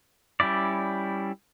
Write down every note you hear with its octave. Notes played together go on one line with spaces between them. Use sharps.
G3 C#4 E4 D5